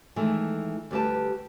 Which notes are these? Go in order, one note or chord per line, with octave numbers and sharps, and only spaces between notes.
D#3 E3 G#3 A3
D2 G3 G4 B4 A5